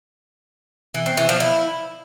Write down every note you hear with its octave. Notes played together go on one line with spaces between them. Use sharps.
E3
C4
E3
F3
E4